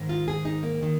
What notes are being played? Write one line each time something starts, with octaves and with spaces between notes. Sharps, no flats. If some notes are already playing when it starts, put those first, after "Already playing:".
Already playing: G#2 D#3
F4
G#4
D#4
A#3
D#3